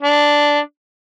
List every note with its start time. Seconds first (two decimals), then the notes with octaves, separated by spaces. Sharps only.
0.02 D4